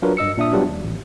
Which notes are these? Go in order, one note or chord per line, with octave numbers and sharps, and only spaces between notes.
F#3 D4 F4 F#4 A#4 B4
G2 D#5 E6 C#7
A#2 D4 E5 D#6
F#3 G3 B3 D4 F4 G4
D#2
A1